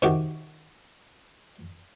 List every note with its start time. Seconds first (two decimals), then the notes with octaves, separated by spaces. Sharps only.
0.02 C3 D#3 D#4 F#4 G4